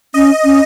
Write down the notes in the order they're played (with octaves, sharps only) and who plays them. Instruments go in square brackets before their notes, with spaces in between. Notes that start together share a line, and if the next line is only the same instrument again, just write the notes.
[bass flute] C#4 [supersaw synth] D#5
[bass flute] C#4